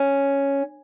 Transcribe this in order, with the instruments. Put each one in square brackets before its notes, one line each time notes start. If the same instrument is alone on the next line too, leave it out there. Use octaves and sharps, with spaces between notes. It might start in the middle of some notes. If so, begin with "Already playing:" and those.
Already playing: [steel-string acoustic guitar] C#4